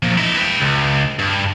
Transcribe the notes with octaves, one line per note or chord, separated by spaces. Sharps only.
F3 A#3
E4 D#5
B4 G5
C#2
G2